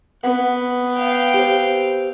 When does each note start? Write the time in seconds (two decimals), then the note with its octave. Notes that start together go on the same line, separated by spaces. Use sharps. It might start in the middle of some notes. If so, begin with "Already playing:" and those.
0.24 B3 F#5
0.97 F5 G5
1.34 G4 C5